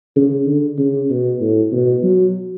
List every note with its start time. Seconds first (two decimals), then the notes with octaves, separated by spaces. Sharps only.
0.16 C#3
0.47 D3
0.78 C#3
1.10 B2
1.41 A2
1.72 B2
2.03 F#3